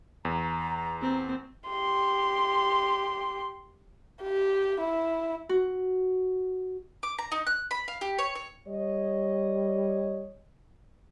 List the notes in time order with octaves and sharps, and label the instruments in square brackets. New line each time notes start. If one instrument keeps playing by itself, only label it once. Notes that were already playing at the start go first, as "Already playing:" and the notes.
[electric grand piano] E2 [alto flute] A#5
[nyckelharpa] C4
[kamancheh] G4 C6
G4
E4
[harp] F#4
[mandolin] D6
A#5
D#4
F#6
B5
F5
G4
C#5
C#5
[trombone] G3 [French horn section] C#5 D#5